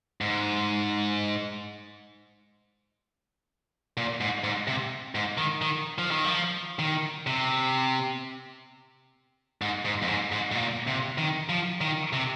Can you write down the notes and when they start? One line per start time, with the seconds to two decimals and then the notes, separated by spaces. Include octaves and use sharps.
0.21 G#2
3.97 A#2
4.21 G#2
4.44 G#2
4.68 C3
5.15 G#2
5.38 D#3
5.62 D#3
5.98 F3
6.11 D#3
6.24 F3
6.79 D#3
7.27 C3
9.62 G#2
9.85 G#2
10.02 F2
10.08 G#2
10.32 G#2
10.51 G#2
10.55 A#2
10.87 C3
11.18 D#3
11.49 F3
11.81 D#3
12.13 C3